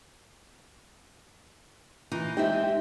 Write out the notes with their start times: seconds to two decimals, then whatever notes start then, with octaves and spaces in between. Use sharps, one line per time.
2.12 E3 D#4 F4
2.37 G#3 C4 D#4 G4 E5 G5